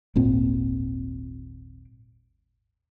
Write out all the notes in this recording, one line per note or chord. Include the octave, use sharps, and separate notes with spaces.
D#1 G#1 A#2 C4